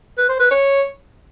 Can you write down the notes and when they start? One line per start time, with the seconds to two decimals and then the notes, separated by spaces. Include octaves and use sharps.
0.18 B4
0.29 C5
0.40 B4
0.51 C#5